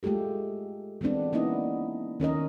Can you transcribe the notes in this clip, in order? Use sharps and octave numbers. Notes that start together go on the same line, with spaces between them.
G#3 A3 F4 G4 A4
E3 G#3 B3 C4 D4
A#3 B3 C#4 D#4 E4 D#5
D#3 C#4 A#4 D#5